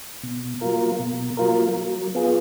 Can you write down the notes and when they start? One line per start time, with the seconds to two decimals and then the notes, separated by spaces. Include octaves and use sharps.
0.23 B2
0.61 F#3 A#3 F4 A#4
0.99 B2
1.37 F#3 A#3 F4 A#4
1.76 F#3
2.15 B3 F4 G#4